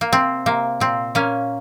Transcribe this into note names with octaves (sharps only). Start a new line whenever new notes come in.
A#3
C3 C4
C3 A#3
A#2 C4
A#2 A#3 C#4